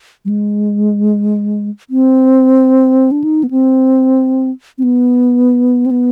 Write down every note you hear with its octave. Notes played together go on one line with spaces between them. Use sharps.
G3
G#3
C4
D4
D#4
B3
C4
C4
B3
C4
B3